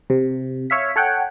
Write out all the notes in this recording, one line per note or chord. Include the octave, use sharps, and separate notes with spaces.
C3
C#5 E5 F5 B6
A4 C#5 F#5 G5